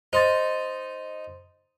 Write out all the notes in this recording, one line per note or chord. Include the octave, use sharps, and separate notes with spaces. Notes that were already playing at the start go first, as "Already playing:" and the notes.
D#4 C5 C6 A6